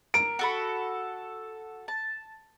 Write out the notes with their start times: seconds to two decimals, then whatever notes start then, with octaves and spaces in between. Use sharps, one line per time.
0.14 A#4 D7
0.39 F#4 A4 B5
1.88 A5